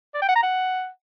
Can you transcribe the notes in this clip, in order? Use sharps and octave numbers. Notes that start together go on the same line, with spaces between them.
D5
G5
F#5
A#5
F#5